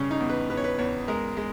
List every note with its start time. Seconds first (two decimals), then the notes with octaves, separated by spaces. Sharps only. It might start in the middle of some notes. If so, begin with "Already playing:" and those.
Already playing: G2 C#3 C#4
0.11 D#4
0.20 E2
0.29 B4
0.50 E2 B4
0.57 C#5
0.64 B4
0.79 E2 C#5
1.08 G#3 A#4
1.37 G#3